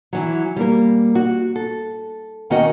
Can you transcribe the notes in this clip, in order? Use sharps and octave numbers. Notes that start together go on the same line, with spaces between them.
E3 F#3
G3 A#3 A#4
F#4
A4
D#2 D#3 C#4 F#4 D#5 F#5